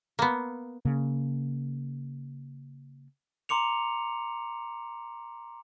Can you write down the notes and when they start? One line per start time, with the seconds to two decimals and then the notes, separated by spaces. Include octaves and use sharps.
0.19 A#3 B3
0.85 C#3 A#3
3.49 A#5 C6 D6 C#7 F7